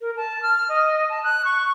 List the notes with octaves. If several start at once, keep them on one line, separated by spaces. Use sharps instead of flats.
A#4
A5
F6
D#5
A5
F#6
C#6